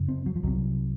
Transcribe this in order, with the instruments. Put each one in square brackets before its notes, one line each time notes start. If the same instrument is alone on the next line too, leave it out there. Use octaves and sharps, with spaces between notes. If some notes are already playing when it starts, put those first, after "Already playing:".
Already playing: [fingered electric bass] F#2 C#3
C4
F#3
F3
C2 C3 F#3